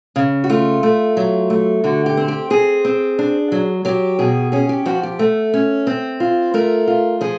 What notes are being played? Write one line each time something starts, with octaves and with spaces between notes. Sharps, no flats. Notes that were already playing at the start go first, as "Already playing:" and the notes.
C#3
F#4
A3 F4
A3
F#3
A3
D3 F#4
G4
C4
G4
C4 G#4
C4
D4
F#3
F#3 G4
B2 G#4
C#4 G#4
G4
F3 F#4
G4
A3
C#4
C4
F4
A3 A#4
F4
F3 G#4